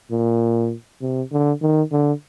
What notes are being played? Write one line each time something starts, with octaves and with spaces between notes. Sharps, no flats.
A#2
C3
D3
D#3
D3